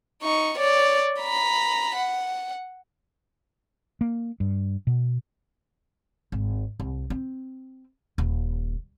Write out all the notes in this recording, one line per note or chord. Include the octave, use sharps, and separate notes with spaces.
D#4 C#6
C#5 D5
A#5 B5
F#5
A#3
G2
B2
G#1
C2
C4
D#1